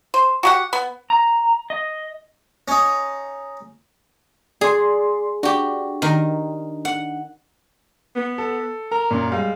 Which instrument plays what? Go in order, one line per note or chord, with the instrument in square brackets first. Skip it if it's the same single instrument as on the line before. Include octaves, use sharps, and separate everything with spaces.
[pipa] C5
F#4 G4 F#5
B3
[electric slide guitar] A#5
D#5
[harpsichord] C#4 D#4
[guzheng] G#4 [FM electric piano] D5 C6
[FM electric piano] D4 [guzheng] F#4 G4
[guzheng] D#3 A#4
F#5
[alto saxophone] B3
[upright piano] A4
[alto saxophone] A#4 [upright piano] A#5
[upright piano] F#2 A#2
[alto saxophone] G3 [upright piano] G#3 F5